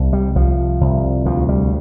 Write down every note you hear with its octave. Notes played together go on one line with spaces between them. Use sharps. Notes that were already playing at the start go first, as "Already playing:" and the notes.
Already playing: C2 C3
G3
C2 F3
C2
D2 F3
G3